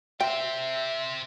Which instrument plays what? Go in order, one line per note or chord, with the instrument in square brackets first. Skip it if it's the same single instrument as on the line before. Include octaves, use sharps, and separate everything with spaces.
[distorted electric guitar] G4 C5 [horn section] E5 [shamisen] G5